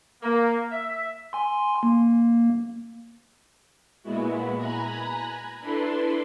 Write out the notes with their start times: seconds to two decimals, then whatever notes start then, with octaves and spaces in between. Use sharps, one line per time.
0.22 A#3
0.71 E5
1.33 G#5 C6
1.83 A#3
4.03 A#2 G#3 B3 E4 F#4
4.57 G#5 A#5 B5 F#6 G#6 A#6
5.60 D4 E4 A4 B4 C6